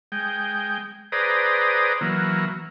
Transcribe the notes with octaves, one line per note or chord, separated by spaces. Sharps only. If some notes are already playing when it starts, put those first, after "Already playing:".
G#3 G5
G#4 B4 C5 D5 A#5 D#6
E3 F#3 A#3